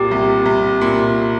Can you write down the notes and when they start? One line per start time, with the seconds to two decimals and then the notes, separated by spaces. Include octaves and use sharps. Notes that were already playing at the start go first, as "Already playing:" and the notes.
Already playing: C2 A#2 G4
0.11 C2
0.45 C2
0.81 A#2